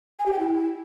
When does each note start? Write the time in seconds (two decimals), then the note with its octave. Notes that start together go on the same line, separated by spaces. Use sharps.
0.19 G#5
0.26 G4
0.32 G5
0.39 E4